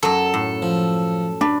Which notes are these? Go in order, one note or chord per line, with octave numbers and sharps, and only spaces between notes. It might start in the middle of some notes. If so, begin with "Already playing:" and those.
F#2 F#3 A4
A2
F3
D4 B4